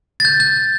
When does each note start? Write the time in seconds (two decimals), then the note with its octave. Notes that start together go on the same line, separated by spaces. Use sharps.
0.20 A6
0.25 G6
0.40 G6